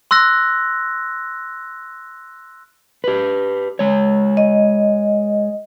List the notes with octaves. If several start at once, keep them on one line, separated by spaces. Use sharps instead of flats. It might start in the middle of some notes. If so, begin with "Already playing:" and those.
C6 E6 F#6 A#6
G4 B4
G#3 C#5
D#5